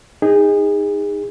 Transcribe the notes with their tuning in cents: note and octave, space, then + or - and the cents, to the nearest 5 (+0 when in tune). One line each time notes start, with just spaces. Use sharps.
D#4 +0 G#4 -30